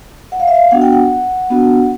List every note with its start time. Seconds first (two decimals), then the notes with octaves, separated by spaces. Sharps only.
0.32 F#5
0.40 F5
0.48 E5
0.55 F5
0.71 B3 D4 F#4 F#5
0.81 G5
0.93 F#5
1.50 B3 D4 F#4